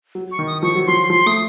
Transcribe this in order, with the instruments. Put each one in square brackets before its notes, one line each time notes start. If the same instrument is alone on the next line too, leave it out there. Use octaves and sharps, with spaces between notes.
[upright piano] F#3
[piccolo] C#6
[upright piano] D#3
[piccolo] D#6
[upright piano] F3 [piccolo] C#6
[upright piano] F#3
[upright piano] F3 [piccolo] C6
[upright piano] F3 [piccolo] C6
[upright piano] A3 [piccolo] D#6